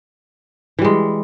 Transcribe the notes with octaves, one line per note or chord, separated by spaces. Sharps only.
E3 G3 G#3